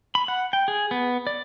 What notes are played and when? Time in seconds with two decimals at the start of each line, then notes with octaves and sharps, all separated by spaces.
0.15 B5
0.28 F#5
0.53 G5
0.68 G#4
0.91 B3
1.27 D5